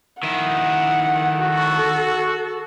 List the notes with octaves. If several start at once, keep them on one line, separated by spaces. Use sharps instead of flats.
D#3 E4 F#5
F#4 A4